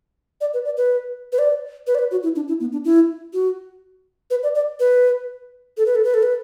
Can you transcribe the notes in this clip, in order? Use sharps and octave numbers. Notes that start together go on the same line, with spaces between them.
D5
B4
D5
B4
B4
D5
B4
D5
B4
F#4
E4
D4
E4
B3
D4
E4
F#4
B4
D5
D5
B4
A4
B4
A4
B4
A4
B4